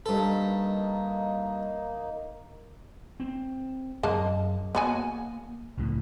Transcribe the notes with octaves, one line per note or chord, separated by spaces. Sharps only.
G2 A#3 D#4 A4
C4
F#2 G#3 A#3 A5
A#3 B3 F#4 G#5
C#2 A2 D3